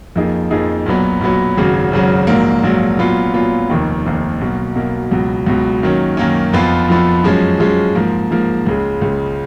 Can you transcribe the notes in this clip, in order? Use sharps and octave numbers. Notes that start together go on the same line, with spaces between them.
F2 F3 A#3 D#4 G#4
F2 F3 A#3 D#4 G#4
B1 A#2 F#3 B3
B1 A#2 F#3 B3
G#1 F#2 C#3 F#3
G#1 F#2 C#3 F#3
A#1 G#2 F#3 A#3
A#1 G#2 F#3 A#3
A#2 F#3 B3 F4
A#2 F#3 B3 F4
F1 D#2 D#3
F1 D#2 D#3
B1 B2 A#3
B1 B2 A#3
C#2 B2 F#3
C#2 B2 F#3
F#2 D#3 F#3 A#3 C#4
F#2 D#3 F#3 A#3 C#4
F2 F3 B3 F4
F2 F3 B3 F4
F#2 F3 G#3 C#4
F#2 F3 G#3 C#4
G#2 F3 A#3
G#2 F3 A#3
C#2 C#3 G#3
C#2 C#3 G#3